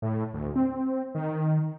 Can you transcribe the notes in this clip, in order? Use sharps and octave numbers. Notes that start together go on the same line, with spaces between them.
A2
D2
C4
D#3